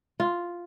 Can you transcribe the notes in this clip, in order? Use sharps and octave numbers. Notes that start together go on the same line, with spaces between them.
F4